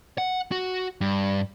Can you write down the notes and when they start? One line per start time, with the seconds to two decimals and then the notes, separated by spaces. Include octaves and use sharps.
0.18 F#5
0.52 F#4
1.01 G2